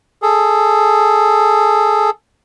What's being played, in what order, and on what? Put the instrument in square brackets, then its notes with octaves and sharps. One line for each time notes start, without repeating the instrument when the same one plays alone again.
[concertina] G#4 A4